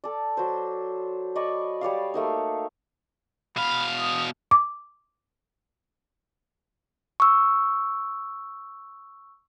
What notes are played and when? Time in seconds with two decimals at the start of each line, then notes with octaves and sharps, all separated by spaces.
0.04 A4 D5
0.37 F#3 C5
1.36 D5 D#5 B5 C#6
1.81 G3 C#5 D5 F5
2.14 A3 A#3 D#4
3.57 B2 F5 B5
3.99 D#6
4.51 D6
7.20 C#6 E6